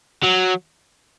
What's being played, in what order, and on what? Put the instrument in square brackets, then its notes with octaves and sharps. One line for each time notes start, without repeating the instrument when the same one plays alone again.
[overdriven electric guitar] F#3